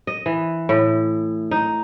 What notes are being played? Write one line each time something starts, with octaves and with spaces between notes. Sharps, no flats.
D#5
E3
A2
D#4